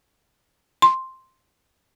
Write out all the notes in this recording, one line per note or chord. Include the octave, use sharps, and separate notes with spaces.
C6